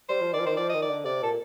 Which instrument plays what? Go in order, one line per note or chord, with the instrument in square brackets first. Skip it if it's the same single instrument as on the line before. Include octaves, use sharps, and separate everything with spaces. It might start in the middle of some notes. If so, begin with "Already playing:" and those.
[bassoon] G3 [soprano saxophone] C5
[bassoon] F3
[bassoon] D#3 [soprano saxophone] D5
[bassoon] F3
[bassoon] D#3 [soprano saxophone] C5
[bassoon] F3 [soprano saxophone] D5
[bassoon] D#3 [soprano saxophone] D#5
[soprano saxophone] D5
[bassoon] D3
[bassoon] C3 [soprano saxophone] D5
[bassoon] A#2 [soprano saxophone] A4